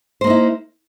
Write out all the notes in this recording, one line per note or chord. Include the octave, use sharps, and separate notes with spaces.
A#3 D#4 E4 C5